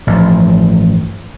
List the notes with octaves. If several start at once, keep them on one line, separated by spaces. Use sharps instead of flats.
A1 G2 F3